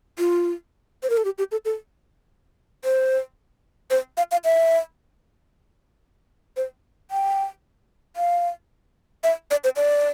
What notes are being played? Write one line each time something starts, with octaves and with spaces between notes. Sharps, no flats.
F4
C5
A#4
A4
G4
G4
A4
A4
C5
C5
F5
F5
E5
C5
G5
F5
E5
D5
C5
D5